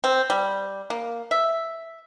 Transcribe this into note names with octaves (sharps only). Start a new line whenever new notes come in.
C4
G3
A#3
E5